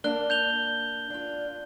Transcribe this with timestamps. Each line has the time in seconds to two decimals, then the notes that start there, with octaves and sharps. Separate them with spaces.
0.04 A#3 D4 F#6 G7
0.30 G6 F7 G7
1.10 D4 F4